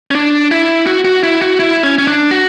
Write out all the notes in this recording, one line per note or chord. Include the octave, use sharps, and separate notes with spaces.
C#4
D4
E4
F#4
F#4
E4
F#4
E4
C#4
C#4
D4
F#4